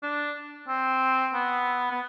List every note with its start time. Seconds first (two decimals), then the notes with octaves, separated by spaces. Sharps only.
0.02 D4
0.68 C4
1.34 B3
1.91 B3